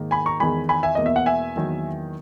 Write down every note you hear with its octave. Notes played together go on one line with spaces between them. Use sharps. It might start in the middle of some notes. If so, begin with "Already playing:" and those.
Already playing: G#2 D#3 A#3
G#5 B5
A#5 C#6
E2 D#3 G#3 G#5 B5
G#5 B5
E5 G#5
E2 B2 A#3 D#5
E5
F#5
E5 G#5
E2 D#3 F#3 A#3